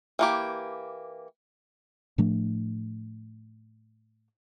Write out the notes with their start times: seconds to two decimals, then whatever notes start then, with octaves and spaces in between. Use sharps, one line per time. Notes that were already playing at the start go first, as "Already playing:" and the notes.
0.19 E3 A#3 G4
2.18 A2 F3 A3 D4